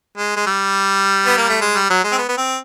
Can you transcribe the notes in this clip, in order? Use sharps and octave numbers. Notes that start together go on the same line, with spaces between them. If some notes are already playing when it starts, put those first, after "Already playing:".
G#3
G#3
G3
B3
A#3
A3
G#3
G3
F#3
G#3
C4
B3
B3
C4